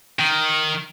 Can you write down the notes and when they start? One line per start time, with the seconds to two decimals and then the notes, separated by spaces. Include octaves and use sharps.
0.19 D#3